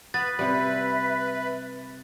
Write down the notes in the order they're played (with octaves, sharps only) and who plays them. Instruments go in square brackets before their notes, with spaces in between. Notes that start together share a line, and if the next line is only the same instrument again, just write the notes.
[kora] B3 [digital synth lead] B4 [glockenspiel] A6
[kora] C3 G3 [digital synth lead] B4 [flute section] E5 B5